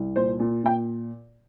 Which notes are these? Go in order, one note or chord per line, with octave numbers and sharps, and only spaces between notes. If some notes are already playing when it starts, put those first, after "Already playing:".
Already playing: C2
A#2 C5
A#2
A#2 G5